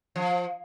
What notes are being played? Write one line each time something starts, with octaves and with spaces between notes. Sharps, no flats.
F3